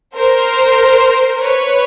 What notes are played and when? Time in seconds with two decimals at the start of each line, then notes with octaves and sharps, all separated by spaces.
0.16 A#4 C5
1.42 B4 C#5